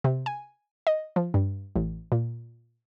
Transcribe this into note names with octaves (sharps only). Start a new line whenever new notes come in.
C3
G#5
D#5
F3
G2
A1
A#2